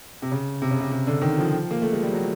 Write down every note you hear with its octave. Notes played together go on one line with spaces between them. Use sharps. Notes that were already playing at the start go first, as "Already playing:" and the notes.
C3
C#3
C3
C#3
C3
C3
D3
D#3
F3
A#3
A3
G#3
G3
F#3